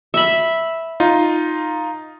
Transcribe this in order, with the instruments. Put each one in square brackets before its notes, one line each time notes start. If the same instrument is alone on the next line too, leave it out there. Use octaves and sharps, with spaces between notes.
[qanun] E5 B5
[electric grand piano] D#4 F4